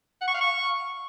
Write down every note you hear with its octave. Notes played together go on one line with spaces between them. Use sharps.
F#5
C#6
F5
C#6